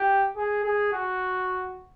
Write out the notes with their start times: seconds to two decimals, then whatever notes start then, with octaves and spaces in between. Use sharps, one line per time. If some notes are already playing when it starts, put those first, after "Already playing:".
Already playing: G4
0.36 G#4
0.64 G#4
0.93 F#4